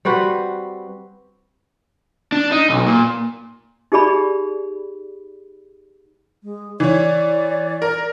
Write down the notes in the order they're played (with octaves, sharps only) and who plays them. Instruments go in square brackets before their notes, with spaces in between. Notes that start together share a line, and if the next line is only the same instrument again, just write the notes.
[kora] G3 C4 F#4 B4
[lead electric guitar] D4
D#4
B1
A#2
[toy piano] D#4 G4 G#4 D5 B5
[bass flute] G#3
[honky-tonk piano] E3 C#5 [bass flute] D5
[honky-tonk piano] A#4